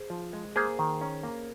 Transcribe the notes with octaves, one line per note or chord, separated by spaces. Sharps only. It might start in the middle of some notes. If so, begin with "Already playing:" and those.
Already playing: G#4 C5
F3
G#3
A#3 G#4 C5
D#3
C#4
A#3